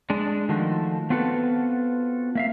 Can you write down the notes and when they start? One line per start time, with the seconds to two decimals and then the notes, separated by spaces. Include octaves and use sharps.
0.10 G#3 D4
0.49 D#3 F3 A3 F#4
1.10 B3 C4 F4 F#4 A4 B4
2.35 A#3 E5 F5